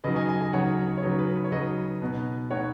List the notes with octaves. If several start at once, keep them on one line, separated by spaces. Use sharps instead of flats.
C#3 F#3 D#4 B4 D#5
D#5 G#5
D#5 G#5
D#5 G#5
C#3 F#3 D#4 C#5 F#5
C#5
C#3 F#3 D#4 B4
B4
B4
C#5
C#3 F#3 D#4 B4 D#5
B2 B3 D#4
B2 B3 D#4 C#5 F#5